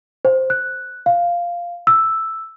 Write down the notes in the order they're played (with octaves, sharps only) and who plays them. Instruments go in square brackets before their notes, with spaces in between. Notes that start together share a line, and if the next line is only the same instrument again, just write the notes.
[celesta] C5
F#6
F5
E6